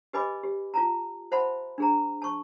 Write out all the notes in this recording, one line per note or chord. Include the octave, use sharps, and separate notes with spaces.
G4 B4 D#5 G#5 B5 D6
G4
F4 A5 A#5
C5 E5 F#5 A5 B5 C6
D4 G#4 A#5
A5 C#6